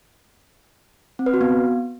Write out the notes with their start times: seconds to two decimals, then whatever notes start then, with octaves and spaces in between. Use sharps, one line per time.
1.19 C4
1.26 B4
1.34 F#4
1.41 B3